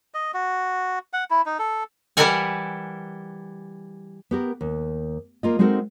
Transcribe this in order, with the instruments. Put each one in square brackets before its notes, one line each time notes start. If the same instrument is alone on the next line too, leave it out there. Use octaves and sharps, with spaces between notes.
[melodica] D#5
F#4
F#5
E4
D#4
A4
[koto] E3 G3 E4 A#4 F#5 G#5
[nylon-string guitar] B3 G4 A#4
D#2
A#3 F4 D#5
G#3 C4 D#4 F#4 A4 A#4